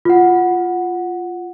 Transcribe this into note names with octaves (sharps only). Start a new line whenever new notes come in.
F4 F#5